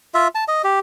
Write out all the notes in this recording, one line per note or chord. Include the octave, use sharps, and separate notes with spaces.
F4 E5
A5
D#5
G4